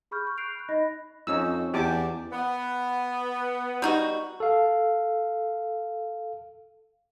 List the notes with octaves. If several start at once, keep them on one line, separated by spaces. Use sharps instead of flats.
G#4 B5 C#6 F6 G6
C#6 G6
F#6 G6 C7 D7 F7
B5 F#6
D#4 D#5 B5 A#6
F2 C#4 D#4 E6
E2 G4 A5 D6
B3
G3 D#4 F#4
A4 F5